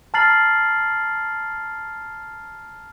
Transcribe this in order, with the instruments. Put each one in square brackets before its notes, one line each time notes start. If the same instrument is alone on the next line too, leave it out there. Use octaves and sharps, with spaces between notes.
[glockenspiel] A5 A#5 F6 A6 C7 F#7